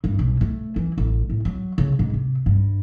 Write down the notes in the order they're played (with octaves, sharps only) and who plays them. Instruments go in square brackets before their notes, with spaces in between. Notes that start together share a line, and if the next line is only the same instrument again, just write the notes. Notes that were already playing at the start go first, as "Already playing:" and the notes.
[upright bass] G2
B1
A3
E3
A1
A2
F#3
C#3
G#2
C3
G2